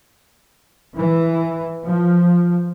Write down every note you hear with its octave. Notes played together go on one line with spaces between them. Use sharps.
E3
F3